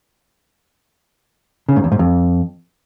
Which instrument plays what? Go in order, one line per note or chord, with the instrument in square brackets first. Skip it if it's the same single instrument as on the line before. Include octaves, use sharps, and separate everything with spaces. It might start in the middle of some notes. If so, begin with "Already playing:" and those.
[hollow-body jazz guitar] C#3
G#2
E2
G#2
F2